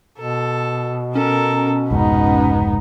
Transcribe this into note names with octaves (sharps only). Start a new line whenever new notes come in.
B2 A4
C#4 A4 A#4
F1 C#2 G#2 B3 D#4